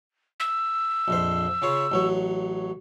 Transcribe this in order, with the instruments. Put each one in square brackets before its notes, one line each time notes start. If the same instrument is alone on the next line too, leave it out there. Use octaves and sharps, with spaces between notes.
[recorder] E6
[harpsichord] A#1 F2 C5
C#3 F4 C#5
A1 F#3 C#5